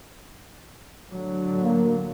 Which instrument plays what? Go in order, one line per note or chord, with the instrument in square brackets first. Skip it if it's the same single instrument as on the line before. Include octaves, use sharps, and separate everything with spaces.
[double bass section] A2 D3 F#3
[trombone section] A#3